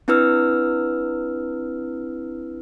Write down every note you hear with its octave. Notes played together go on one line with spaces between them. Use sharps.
C4 D4 E4 B4 E6 F6